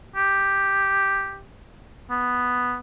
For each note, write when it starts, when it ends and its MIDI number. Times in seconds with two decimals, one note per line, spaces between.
0.16 1.41 67
2.11 2.77 59